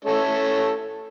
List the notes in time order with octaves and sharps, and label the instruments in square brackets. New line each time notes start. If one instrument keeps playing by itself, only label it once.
[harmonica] A3 C#4 A4